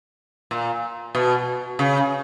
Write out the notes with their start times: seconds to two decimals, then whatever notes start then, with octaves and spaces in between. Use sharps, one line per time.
0.51 A#2
1.15 B2
1.79 C#3